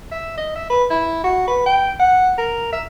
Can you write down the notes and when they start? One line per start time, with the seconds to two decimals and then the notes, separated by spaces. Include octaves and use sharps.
0.12 E5
0.38 D#5
0.56 E5
0.70 B4
0.90 E4
1.24 F#4
1.48 B4
1.66 G5
1.99 F#5
2.38 A#4
2.73 E5